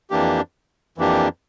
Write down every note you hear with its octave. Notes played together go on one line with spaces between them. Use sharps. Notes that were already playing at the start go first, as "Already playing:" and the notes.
F2 E3 A#3 D4 G4
F2 E3 A#3 D4 G4